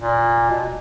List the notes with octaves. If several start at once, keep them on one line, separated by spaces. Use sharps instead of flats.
A#2
B2